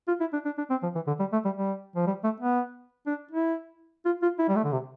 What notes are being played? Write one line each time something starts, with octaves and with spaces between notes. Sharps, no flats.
F4
E4
D4
D4
D4
C4
F3
E3
D3
G3
A3
G3
G3
F3
G3
A3
B3
D4
E4
F4
F4
E4
G3
A3
D3
C3